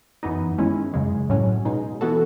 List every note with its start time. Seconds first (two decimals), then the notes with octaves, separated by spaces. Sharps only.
0.23 F#2 E3 B3 D#4
0.58 D#3 G#3 C#4 E4
0.94 F#2 C#3 G#3
1.30 A2 F#3 C#4
1.65 B2 G#3 D#4
2.01 E3 B3 F#4 A4